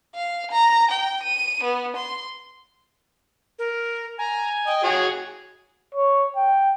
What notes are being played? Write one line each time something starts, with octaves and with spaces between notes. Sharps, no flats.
F5
A#5
G5
D#7
B3
C6
A#4
G#5 A#5
D#5 G5
F#4 G#4 C#5
C#5
G5